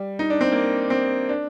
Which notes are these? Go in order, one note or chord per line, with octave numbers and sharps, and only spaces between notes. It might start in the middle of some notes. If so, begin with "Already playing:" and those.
Already playing: G3
D#4
D4
C4
A#3
C4
D4